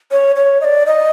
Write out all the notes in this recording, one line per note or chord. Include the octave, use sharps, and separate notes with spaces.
C#5
C#5
D#5
D5
D#5